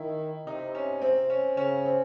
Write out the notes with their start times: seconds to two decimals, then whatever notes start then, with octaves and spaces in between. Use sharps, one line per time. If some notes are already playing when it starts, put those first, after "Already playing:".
Already playing: D#3 E4
0.47 C3 D#4
0.75 C#4
1.02 C4
1.30 C#4
1.57 C#3 C#4
1.85 C4